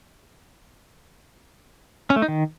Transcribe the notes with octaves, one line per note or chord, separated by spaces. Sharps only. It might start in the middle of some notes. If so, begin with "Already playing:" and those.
C#4
A3
D#4
D#3